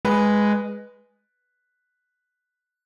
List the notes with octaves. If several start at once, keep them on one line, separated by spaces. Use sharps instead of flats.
G#3 B4